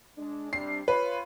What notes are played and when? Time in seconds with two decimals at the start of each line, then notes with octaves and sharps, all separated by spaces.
0.18 G#3 D4
0.53 C3 G3 D4 C7
0.88 F4 B4 C#5